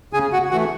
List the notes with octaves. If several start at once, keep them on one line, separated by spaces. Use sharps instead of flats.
C#3 G#4 G#5
F#4 F#5
E3 A3 F#4 F#5